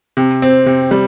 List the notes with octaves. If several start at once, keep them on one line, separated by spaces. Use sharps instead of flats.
C3
C4
C3
G3